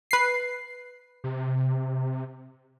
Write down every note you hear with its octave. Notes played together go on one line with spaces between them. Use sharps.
B4 C7
C3